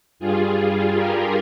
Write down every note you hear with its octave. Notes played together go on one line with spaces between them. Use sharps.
G2 G3 F4 G#4
G4 A#4